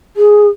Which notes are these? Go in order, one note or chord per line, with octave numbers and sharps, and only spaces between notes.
G#4